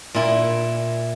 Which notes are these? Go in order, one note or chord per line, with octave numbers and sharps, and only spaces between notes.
A#2 E4